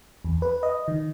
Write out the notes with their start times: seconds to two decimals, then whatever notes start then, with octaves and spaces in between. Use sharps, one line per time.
0.25 E2
0.42 B4
0.63 D#5
0.88 D#3